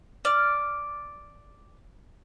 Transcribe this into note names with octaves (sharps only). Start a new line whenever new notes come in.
D5 F6